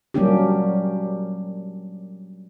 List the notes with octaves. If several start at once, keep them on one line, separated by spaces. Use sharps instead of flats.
F#3 G3 A#3 C#4 D4 G4